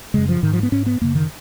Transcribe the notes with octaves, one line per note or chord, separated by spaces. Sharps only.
F#2 C#3 G#3
F3
G#2 D#3
F3
B3
G#2 C#4
B3
F#2 C#3 A#3
D#3